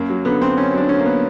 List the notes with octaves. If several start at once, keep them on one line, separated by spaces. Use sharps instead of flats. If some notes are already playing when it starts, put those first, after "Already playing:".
Already playing: F#2 A#3
F#3
D3 B3
F#2 C4
F#2 C#4
F#3 D4
D3 C#4
A#3
B3